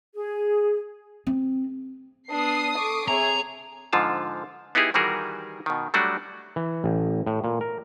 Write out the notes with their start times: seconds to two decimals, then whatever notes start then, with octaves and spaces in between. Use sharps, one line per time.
0.14 G#4
1.27 C4
2.31 B3 D4 B4 A5 D#6 C7
2.76 A4 C#6 D6
3.08 C4 G#4 C#5 E5 G#5 A#5
3.93 G#2 D3 F3 F4 A5
4.75 B3 D#4 E4 G4 G#4
4.94 D#3 E3 G3 F#4 G#4 A#4
5.66 B2 D#3
5.94 F#3 G3 A3 D4 F#4
6.56 E3
6.84 A1
7.27 A2
7.44 A#2
7.61 A#4